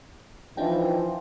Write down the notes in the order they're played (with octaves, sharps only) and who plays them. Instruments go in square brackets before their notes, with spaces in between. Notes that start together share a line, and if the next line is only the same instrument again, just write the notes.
[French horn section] E3 F3 [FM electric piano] D4 D#4 G5